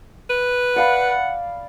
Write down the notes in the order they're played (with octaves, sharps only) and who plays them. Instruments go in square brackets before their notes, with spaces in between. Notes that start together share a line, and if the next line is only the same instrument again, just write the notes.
[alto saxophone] B4
[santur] D5 F5 B5 [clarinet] F#5